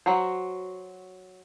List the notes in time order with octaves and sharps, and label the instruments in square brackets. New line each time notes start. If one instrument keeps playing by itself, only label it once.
[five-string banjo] F#3 F#4 C5